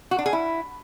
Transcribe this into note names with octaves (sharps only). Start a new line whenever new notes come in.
F#4
D4
G#4
E4